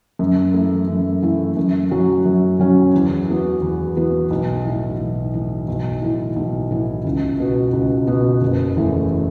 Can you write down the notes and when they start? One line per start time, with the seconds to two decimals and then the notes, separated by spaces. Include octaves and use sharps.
0.19 F#2
0.54 E3 A3 E4
0.88 F#2
1.22 E3 A3 E4
1.57 F#2
1.91 F#3 C#4 F#4
2.25 F#2
2.59 F#3 C#4 F#4
2.94 E2
3.28 E3 B3 F#4
3.62 E2
3.96 E3 B3 F#4
4.31 B1
4.65 A2 E3
4.99 B1
5.33 A2 E3
5.68 B1
6.02 A2 E3
6.36 B1
6.71 A2 E3
7.04 C#2
7.39 B2 B3 F#4
7.73 C#2
8.07 B2 B3 F#4
8.42 F#1
8.76 E2 E3 A3